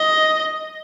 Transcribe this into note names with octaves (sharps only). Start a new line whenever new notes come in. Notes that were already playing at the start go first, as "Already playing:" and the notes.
Already playing: D#5